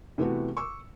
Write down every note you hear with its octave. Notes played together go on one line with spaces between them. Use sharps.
C3 E3 A3 B3 F#4
C#6 D6 E6